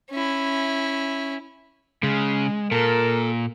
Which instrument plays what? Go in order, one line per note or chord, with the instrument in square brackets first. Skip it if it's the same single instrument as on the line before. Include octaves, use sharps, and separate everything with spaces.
[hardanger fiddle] C#4 E4
[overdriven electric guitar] C#3 [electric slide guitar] G#3
[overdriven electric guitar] A#2 [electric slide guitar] A4 [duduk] A#4